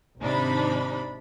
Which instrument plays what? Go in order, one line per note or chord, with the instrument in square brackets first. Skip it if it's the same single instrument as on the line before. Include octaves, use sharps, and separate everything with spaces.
[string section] G#1 C3 D4 D#4 B5